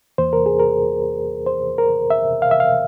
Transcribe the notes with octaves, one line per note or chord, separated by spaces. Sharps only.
E2 E3 A#3 C5
A#4
G#4
A#4
C5
A#4
E5
F5
E5
F5